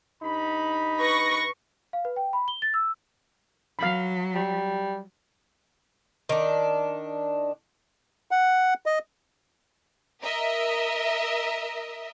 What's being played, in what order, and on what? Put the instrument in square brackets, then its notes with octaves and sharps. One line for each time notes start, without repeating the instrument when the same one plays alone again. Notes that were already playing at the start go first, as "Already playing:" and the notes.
[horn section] G2 D#4 B5
[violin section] B4 C#6 A#6
[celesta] F5
B4
G5
B5
G7
A6
E6
[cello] F#3 [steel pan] F5 B5
[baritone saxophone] G3
[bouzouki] D#3 D4
[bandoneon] F#5
D#5
[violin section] A#4 D#5 E5